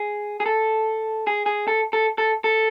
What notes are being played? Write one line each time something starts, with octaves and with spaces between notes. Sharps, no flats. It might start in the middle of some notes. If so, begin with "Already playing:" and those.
Already playing: G#4
G#4
A4
G#4
G#4
A4
A4
A4
A4